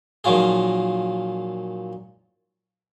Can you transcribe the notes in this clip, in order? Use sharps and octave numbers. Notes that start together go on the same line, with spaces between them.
A#2 D#3 F3 F#3 F4 G#4